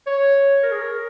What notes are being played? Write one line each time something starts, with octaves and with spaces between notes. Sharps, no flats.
C#5
A#4
G#4
A#4